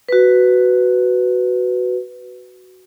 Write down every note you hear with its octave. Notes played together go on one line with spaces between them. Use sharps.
F#4 B4